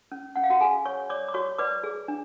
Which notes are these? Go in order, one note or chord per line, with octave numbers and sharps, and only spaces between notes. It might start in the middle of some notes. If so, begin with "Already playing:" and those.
C#4
C#4 F#5
F5
F#4 F#5
F#4 G#4 G#5
C#5 C#6
C#5 D5 D6
D6
F#4 C#5 C#6
B4 D5 D6
G#4
D4